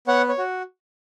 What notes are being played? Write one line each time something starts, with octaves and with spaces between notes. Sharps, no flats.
B3 C#5 F#5
C#5
F#4